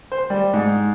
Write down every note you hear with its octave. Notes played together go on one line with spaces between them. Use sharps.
C5
G3
G#2